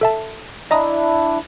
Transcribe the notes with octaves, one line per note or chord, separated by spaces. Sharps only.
A4 E5 A5
D4 E4 D#5 A#5 D#6